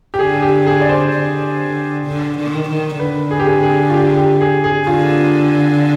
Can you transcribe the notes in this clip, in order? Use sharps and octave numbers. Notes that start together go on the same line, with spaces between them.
G4
D3 G#4
G4
G#4
D5
C5
D3
D3
D#3
D#3
D3 B4
G#4
G4
G#4
G#4
F4
G4
G4
G#4
G#4
D3 F4